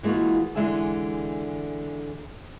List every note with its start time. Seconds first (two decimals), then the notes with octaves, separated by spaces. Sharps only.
0.03 E3 G#3 A#3 F4 F#4
0.55 D3 E3 G#3 G#4 E5 G#5